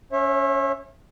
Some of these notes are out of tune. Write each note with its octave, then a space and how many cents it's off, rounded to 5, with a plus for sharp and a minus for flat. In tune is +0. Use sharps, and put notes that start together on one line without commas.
C#4 +10 C#5 -35 E5 +0